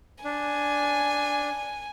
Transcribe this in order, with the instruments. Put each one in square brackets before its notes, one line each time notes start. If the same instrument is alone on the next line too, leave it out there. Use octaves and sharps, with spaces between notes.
[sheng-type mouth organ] D4 [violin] G#5